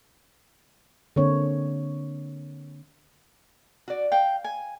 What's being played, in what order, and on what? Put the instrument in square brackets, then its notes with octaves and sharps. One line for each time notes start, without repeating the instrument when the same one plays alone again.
[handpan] D3 A#3 C4 D4 C#5
[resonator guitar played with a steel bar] F#4 D5
[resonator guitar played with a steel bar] F5 [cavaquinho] G5
[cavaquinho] G#5